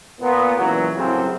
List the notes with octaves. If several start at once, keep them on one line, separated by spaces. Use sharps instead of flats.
A#2 B3
C#2 A#2 E3 F#3
C2 F#2 A2 C#3 C4 F#4